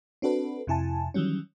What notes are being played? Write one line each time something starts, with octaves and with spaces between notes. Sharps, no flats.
C4 D4 F#4 A4 B4
F2 C3 E4 G#5 A5
D#3 E3 F#3 G3 C#4